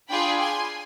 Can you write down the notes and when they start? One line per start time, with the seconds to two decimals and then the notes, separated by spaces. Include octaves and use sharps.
0.08 D4 F4 G#4 G5 B5
0.39 G#5 C6